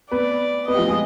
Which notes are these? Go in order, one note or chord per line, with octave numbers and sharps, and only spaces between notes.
B3 B4 D5
B3 B4 D#5
G4
F3 F4
G#3 G#4